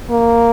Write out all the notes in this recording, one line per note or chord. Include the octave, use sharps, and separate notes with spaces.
A#3